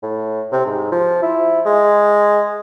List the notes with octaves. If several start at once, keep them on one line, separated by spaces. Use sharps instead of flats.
A2
C3
G#2
F3
E4
G#3